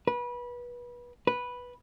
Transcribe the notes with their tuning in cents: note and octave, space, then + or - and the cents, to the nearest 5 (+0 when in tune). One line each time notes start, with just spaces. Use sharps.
B4 -25
B4 -5